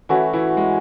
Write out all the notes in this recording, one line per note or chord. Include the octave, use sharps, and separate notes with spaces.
E3 A3 C#4 E4 F#4
E3 E4
G#3